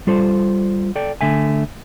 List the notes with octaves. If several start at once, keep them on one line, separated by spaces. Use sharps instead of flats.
G3 F4 A4 C5
A4 D5 G5
D3 A3 E5 G#5